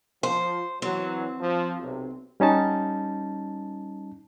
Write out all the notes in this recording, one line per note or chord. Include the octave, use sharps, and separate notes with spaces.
F3 C5
E3 F#3 C4
F3
B1 C3
G3 C#4 D#4 A5